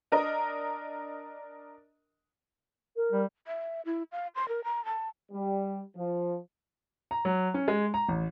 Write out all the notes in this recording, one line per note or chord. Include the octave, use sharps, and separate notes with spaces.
D4 A#4 D#5
A#4
G3
E5
E4
F5
C6
A#4
A#5
A5
G3
F3
A#5
F#3
C#4
G#3
A#5
A1